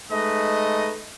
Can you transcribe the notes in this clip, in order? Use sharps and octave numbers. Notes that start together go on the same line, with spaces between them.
G#3 A3 D#4 B4 D#5